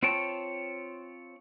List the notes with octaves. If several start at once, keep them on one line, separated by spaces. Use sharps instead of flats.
C4 F4 C#5 G5 A5